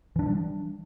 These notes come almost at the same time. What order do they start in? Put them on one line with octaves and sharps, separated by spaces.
E3 D4 F3 G3